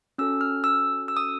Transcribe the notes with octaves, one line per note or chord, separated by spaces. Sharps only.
C#4 F#4 A4 E6
F6
E6
E6
D#6